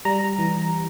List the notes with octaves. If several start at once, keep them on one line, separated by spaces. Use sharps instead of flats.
G3 A#5
E3